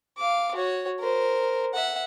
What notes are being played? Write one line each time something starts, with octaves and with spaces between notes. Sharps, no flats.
F5 D6
F#4 C#5
A#4 C5
E5 F#5